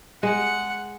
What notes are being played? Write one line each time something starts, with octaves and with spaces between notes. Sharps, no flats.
G#3 F#5